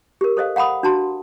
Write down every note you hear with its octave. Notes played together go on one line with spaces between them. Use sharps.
G4 A#4
A4 C5 D#5 F5
F5 F#5 A#5 B5 D#6
D4 F#4 A5 A#5 C6